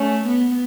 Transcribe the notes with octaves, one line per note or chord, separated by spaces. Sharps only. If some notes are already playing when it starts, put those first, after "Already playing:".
Already playing: A3 C#4
B3